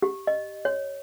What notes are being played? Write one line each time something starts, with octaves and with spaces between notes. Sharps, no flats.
G4
D#5
C#5